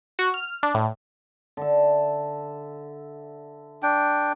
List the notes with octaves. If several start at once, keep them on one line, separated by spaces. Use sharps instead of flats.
F#4
F6
D4
A2
D3 E5
D4 G5